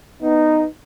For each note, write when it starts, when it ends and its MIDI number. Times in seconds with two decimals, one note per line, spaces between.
0.21 0.64 59
0.21 0.64 63